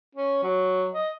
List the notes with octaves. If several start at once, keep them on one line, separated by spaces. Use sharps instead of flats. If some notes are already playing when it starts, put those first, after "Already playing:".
C#4
F#3
D#5